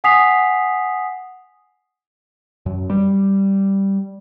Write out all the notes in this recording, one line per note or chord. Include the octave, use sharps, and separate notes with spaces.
F#5 G#5 D#6 B6 C7 F7
F#2
G3